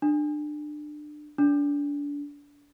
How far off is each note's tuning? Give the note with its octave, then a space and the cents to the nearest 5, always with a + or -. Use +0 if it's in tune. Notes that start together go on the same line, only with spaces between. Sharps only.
D4 +25
D4 -30